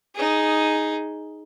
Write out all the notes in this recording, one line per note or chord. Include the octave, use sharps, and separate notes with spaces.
D#4 G#4